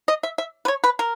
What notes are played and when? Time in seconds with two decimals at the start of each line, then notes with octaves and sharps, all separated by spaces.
0.08 D#5
0.23 E5
0.38 E5
0.65 B4
0.68 C#5
0.84 B4
0.99 A#4